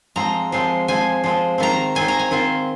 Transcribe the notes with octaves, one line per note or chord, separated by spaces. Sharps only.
F3 G#3 C4 A#5
F3 G#3 C4
F3 G#3 C4 G#5
F3 G#3 C4
D#3 C4 F4 A#5
D#3 C4 F4 G#5
A#5
G#5
D#3 C4 F4